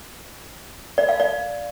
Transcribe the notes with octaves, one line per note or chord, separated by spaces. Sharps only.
D5
F5
D5